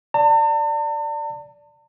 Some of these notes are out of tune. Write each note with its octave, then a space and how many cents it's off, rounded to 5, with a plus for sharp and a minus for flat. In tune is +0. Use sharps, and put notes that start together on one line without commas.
D5 -5 A5 +45